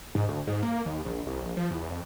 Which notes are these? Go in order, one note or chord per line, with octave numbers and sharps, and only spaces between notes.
G#2
D2
G#2
A#3
D#2
A#1
C2
A#1
F3
E2
F2